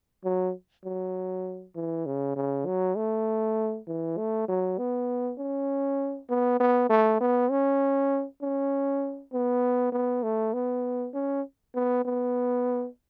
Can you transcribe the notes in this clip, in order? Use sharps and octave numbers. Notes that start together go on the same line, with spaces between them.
F#3
F#3
E3
C#3
C#3
F#3
A3
E3
A3
F#3
B3
C#4
B3
B3
A3
B3
C#4
C#4
B3
B3
A3
B3
C#4
B3
B3